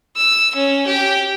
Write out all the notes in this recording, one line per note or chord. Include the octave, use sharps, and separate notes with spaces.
E6
C#4
G4